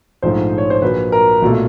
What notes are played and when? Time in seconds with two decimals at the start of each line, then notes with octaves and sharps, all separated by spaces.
0.22 A#1 G#2 F3 A3 C5
0.58 C#5
0.70 C5
0.82 A#1 A#2 F#3 B4
1.12 A#4
1.42 B1 A#2 F#3 A3